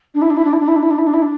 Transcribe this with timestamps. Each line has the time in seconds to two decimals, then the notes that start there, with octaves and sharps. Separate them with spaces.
0.15 D4
0.22 E4
0.30 D4
0.37 E4
0.45 D4
0.53 E4
0.60 D4
0.68 E4
0.76 D4
0.83 E4
0.91 D4
0.98 E4
1.07 D4
1.14 E4
1.22 D4